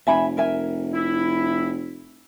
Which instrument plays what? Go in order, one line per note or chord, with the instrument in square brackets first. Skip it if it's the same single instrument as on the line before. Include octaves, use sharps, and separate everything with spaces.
[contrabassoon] F1 [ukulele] E5 G#5 B5
[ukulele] A#4 E5 G#5
[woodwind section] E4